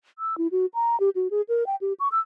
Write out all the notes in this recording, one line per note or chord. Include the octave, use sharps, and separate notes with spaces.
E6
E4
F#4
A#5
G4
F#4
G#4
A#4
G5
G4
C#6
E6